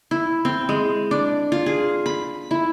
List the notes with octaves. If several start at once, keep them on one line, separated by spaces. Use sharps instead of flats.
E4
C4
G#3
D4
F4
G#4
B5
E4